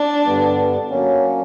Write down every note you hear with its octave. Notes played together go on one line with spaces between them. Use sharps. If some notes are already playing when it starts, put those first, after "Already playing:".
Already playing: D4
G2 D3 G3 B3
F#3 A#3 C#4